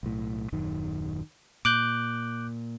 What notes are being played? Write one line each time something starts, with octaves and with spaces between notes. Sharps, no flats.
B1 A2
D#1 F#2 D#3
A#2 D6 F#6 G6